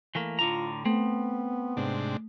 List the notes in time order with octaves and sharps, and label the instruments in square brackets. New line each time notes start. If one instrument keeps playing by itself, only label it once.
[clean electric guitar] E3 A3 A#3
[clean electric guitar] A2 D3 A#5 [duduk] F4
[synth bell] A3 [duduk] B3 [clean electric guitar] C4
[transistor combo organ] G#2 C3 D4